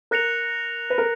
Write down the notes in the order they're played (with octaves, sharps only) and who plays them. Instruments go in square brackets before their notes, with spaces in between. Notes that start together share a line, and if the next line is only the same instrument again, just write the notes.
[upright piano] A#4 [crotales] F#6 A#6 C#7 F7
[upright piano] B4
A#4